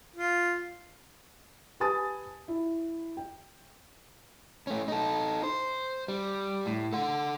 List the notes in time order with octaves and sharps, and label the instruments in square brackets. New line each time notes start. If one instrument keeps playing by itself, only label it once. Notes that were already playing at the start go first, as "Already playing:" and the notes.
[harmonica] F4
[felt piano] G4 B4 G#5 A5 D#6 A6
E4
G5
[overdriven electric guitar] A3 C#4
D#4 A4
C5
G3
A2
A4 F#5